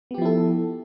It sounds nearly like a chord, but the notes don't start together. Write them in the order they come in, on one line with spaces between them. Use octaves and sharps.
B3 G4 F3 E4 A4